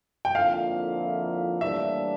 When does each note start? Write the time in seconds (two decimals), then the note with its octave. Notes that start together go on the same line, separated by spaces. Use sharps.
0.25 G5
0.34 F2 D3 F3 A#3 E4 F5
1.61 A2 E3 G3 A#3 D4 E5